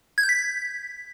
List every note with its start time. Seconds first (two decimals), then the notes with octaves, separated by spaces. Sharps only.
0.18 G#6
0.23 G6
0.29 B6